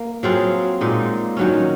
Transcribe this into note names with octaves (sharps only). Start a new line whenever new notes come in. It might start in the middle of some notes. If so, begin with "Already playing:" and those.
Already playing: A#3
F#3 C4 F4 G#4
A#2 G#3 D#4
D#3 F#3 C#4